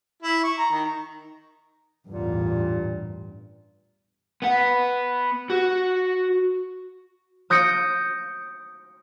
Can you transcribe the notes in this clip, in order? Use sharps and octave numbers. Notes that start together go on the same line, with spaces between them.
E4
C#6
A#5
D#3
A1 E2 G2 A#2
B3 F#5
F#4
D#6 G6 A#6 C#7 D7